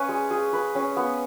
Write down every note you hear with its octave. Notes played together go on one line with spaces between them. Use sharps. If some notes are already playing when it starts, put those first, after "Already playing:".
Already playing: C#4 B4
G#3
G#4
B4
C#4
B3